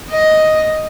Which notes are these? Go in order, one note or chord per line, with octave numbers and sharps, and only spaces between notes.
D#5